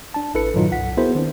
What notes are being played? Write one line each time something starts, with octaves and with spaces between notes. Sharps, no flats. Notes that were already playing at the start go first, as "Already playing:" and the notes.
D4 A5
A1 E4 A4 B4 C#7
G2 A#2 D#3 F#3 D#4 F4
C2 F#5 B6
B3 E4 F#4 G#4 A#4 C5
D#3 C4 D4